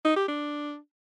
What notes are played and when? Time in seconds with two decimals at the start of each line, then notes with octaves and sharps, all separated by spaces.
0.05 D#4
0.16 G4
0.28 D4